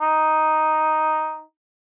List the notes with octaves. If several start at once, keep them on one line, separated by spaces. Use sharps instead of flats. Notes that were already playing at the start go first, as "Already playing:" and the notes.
D#4